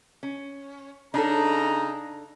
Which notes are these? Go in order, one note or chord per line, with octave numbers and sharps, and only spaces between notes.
C#4
C#3 D4 D#4 A4 A#5